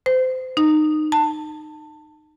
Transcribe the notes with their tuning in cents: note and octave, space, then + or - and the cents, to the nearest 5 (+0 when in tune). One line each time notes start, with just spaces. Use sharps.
C5 -30
D#4 -20
A5 +20